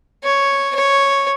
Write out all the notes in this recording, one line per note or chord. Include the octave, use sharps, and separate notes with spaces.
C#5
C#5